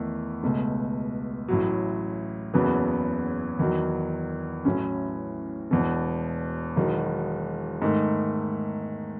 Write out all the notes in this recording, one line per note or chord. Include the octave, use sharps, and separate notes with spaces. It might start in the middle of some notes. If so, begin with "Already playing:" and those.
Already playing: E2 D#3 A3
C#2 B2 A3
A1 A2 F#3
F#1 E2 C#3 F#3 B3
E2 D#3 F#3
A1 A2 F#3 C#4
E1 E2 B2
E1 E2 D#3 F#3
G#2 D#3 A3